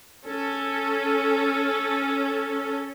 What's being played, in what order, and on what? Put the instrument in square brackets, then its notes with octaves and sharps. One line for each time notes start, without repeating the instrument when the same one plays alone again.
[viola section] C#4 A4